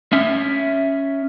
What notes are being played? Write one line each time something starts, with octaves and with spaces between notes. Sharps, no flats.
C#4 E5